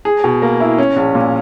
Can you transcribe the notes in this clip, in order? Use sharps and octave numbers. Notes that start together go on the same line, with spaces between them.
G#4
B2
A#3
E4
C#4
A#1
A#2